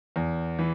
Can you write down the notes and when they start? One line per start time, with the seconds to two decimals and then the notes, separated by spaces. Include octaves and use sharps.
0.16 E2
0.59 E3